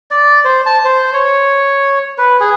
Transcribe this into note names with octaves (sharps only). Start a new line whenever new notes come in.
D5
C5
A5
C5
C#5
B4
G#4